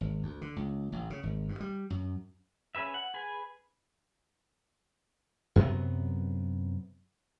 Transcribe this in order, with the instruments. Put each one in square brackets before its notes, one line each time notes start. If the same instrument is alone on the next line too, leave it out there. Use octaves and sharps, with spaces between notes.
[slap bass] G#1
D2
D3
C#2
A1
C#3
G#1
G2
G3
F#2
[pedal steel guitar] C#4 G#4 B4 E5
F#5
G#4 B4 G#5
[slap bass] F#2 C3 F#3 B3